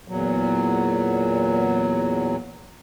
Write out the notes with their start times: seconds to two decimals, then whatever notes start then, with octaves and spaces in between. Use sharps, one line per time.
0.08 E2 A#2 F#3